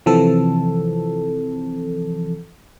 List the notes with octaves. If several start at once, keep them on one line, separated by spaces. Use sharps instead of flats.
C3 E3 F3 C4 A4